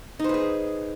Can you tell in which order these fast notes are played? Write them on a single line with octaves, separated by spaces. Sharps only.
D#4 C5 B4 G#4